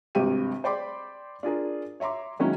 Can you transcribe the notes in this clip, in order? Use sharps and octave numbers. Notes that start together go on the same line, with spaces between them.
G#1 G2 C3 C4 G4 D#7
C5 D5 G5 B5 C6 D6
D4 F4 G#4 A#4
C#5 E5 A#5 C6 D6
D#3 F#3 G#3 A#3 C#4 E4